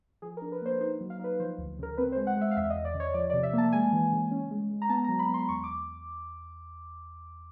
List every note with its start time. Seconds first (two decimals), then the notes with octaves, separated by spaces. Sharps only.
0.22 F3 G#4
0.37 A#4
0.42 D4
0.52 B4
0.62 A#3 C5
0.80 D#4 C5
1.01 F#3
1.10 F5
1.19 D#4 B4
1.40 F3 C5
1.58 D2
1.79 C#3 A#4
1.98 C4 B4
2.12 C5
2.17 G#3
2.27 F#5
2.36 G#3 E5
2.51 F5
2.57 E2 E5
2.70 D#5
2.76 E2
2.85 D5
2.95 C#3
3.00 C#5
3.14 F3 D5
3.30 D5
3.33 C3
3.43 E5
3.53 A#3 A5
3.72 G#3 G#5
3.93 E3
4.12 C#3
4.31 C#4
4.51 G#3
4.70 G#3
4.82 A#5
4.90 B3 A5
5.04 A#5
5.09 F#3
5.19 B5
5.29 B3
5.34 C6
5.49 E2 C#6
5.64 D6